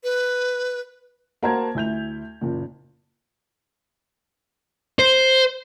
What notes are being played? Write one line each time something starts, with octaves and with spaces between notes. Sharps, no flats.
B4
A#3 F#4 A#4 C5 A5 G#6
D2 E4 G6 F7
F#1 A#2
C5